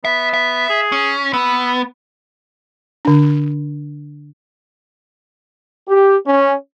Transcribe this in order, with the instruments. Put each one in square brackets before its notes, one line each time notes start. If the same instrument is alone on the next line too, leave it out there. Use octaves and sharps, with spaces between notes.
[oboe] B3 [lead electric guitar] E5
[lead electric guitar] E5
[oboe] G#4
[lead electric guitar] C#4
[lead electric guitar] B3 [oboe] E6
[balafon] D3 D4
[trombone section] G4
C#4